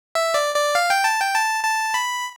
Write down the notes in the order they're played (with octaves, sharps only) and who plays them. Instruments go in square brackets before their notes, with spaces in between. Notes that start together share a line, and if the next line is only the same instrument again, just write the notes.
[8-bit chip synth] E5
D5
D5
F5
G5
A5
G5
A5
A5
B5